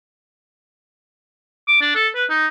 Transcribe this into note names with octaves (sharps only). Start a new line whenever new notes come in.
D6
D4
A4
B4
D#4